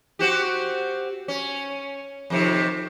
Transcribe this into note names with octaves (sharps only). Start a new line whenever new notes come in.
C4 F#4 G4
C#4
F2 C3 D#3